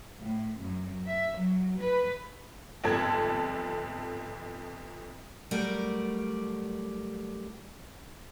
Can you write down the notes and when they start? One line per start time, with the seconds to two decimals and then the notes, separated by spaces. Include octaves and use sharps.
0.20 A2
0.58 F#2
1.06 E5
1.39 F#3
1.79 B4
2.84 G1 F2 G#2 A4 A5 G#6
5.51 F#3 G3 A3 A#4 D5